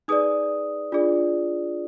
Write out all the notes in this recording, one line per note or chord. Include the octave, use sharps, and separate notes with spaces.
D#4 G#4 B4 D5 D#6
D4 F4 G#4 D5